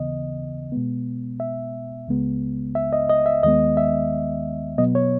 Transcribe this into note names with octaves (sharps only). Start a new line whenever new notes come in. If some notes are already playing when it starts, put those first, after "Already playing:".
Already playing: D#2 C#3 E3 B3 D#5
B2 G#3 B3
E5
C#2 C#3 G#3 B3
E5
D#5
D#5
E5
D#2 D#3 G#3 B3 D#5
E5
B2 F#3 B3 D#5
C#5